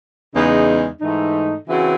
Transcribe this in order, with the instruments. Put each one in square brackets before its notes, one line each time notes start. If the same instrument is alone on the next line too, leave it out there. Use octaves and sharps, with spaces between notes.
[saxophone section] E2 C#3 G#3 D#4
G#2 E3 A3 D#4
C#3 E3 C4 F#4